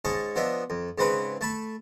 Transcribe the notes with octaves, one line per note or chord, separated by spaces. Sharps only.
G#2 C#4 D#5 A5 C#6
F3 B3 D4 D#5 E5
F2
G#2 C#3 C4 G#4 B4 B5
A3 A5 B5